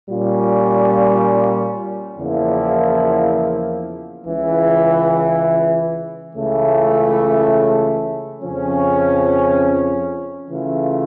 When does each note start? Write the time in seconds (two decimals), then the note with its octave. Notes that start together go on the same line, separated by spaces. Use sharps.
0.10 A#2 G3 C#4 F4
2.18 E2 C#3 F3 A#3 E4
4.26 C#2 C#3 E3
6.35 C#2 C#3 E3 A3
8.42 F2 C#3 F3 C#4
10.51 C#3 E3 A3 C#4 F4